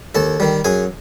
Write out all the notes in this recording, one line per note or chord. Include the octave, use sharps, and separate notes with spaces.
D#2 A4 A5
D#3 G3
F#2 G#4 G#5